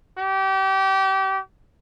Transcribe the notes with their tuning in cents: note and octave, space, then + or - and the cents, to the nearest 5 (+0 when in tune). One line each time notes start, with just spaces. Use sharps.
G4 -30